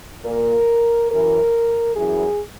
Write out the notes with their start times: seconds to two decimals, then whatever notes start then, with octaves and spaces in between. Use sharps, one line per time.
0.23 A#2 A#4
1.09 F#2 E3 A#4
1.94 F#2 E3 G#4